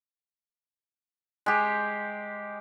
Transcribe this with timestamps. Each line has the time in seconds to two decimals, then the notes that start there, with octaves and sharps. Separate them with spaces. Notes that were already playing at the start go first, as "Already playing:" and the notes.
1.46 G#3 G4